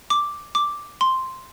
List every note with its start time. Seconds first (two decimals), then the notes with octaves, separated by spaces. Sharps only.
0.10 D6
0.55 D6
1.01 C6